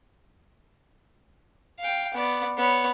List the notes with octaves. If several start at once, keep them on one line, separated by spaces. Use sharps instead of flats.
F5 G5
B3 D5
B3 C#5